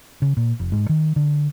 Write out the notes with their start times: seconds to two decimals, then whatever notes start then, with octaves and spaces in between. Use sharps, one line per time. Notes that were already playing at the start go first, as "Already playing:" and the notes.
0.22 C#3
0.37 A#2
0.60 F1
0.72 G#2
0.89 D#3
1.16 D3